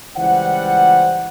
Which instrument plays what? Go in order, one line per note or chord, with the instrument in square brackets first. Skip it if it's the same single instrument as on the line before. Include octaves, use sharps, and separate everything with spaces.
[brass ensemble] C#2 E3 G3 C5 F#5